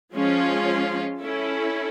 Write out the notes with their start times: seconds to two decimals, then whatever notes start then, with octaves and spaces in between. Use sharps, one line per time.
0.12 F3 G#3 C#4 F4
1.21 C#4 E4 A4